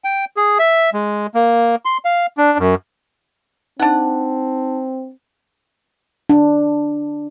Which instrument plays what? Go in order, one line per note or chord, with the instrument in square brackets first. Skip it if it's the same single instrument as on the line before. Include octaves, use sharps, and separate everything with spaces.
[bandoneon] G5
G#4
E5
G#3
A#3
C6
F5
D4
F#2
[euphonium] C4 [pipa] D4 F#5 [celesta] D#4 A5
[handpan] D4